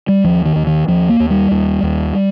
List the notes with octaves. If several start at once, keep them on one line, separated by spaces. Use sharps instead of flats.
G3
D#2 F3
D#3
D#2
D#3
D#2 F3
A#3
D#2
G3
D#2
D#2